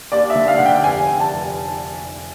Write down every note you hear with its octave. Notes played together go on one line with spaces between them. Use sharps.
D#2 D5
E5
D3
F5
D3 F#5
G5
F1 G#5
F1
A5
F1